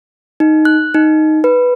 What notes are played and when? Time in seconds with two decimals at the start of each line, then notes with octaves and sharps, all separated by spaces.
0.40 D#4
0.65 F#6
0.94 D#4
1.44 B4